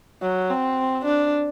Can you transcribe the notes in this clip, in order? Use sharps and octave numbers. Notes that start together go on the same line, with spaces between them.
F#3
C4
D4